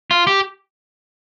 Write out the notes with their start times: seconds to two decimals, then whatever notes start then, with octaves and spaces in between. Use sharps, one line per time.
0.11 F4
0.27 G4